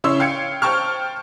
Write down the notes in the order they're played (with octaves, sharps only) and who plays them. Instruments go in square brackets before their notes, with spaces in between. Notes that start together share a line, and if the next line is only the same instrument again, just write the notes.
[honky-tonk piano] C#3 E4 C#5 C6 E6
F5 G5 G#6 C#7
C5 G5 A5 C#6 F6